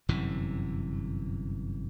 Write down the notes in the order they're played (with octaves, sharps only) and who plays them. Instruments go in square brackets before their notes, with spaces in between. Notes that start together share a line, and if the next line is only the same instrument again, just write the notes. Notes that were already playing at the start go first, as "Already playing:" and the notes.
[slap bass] G1 F#2 C3 E3